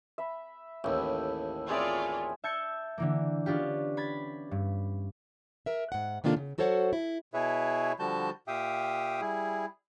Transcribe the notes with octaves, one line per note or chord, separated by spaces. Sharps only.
E5 B5
A1 D#2 E4 A4 G5 B5
C4 F4 G#4 C#5 D5 E5
E5 A5 G6 G#6 C#7
D3 E3 A#3
B3 C#4 D4 F4 G4
B5 G#6 A6
G2
A#4 E5
G#2 F#5
C3 D#3 A#3 D4 F4 A4
C#3
F#3 F#4 A4 C5 C#5 F#5
E4
B2 E4 G#4 B4 C#5 E5
D3 F3 G3 F#4 A5 G6
A#2 G4 E5 F5 G5 D#6
G3 E4 G#4